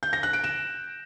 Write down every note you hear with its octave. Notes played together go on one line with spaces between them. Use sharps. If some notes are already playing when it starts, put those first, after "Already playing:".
G6
A#6
F#6
D7
E7